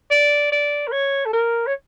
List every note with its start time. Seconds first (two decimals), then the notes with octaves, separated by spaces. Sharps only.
0.11 D5
0.52 D5
0.87 A#4
0.92 C#5
1.25 A4
1.33 A#4
1.67 C#5